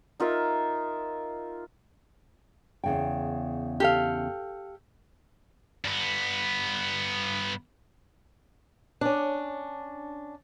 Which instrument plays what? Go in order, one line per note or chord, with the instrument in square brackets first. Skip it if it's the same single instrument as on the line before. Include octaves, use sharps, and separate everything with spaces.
[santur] D#4 F4 A#4 E5
[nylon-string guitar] E2 C#3 G5
[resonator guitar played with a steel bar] G4 A4 F5
[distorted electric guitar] G2 B3
[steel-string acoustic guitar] C#4 D4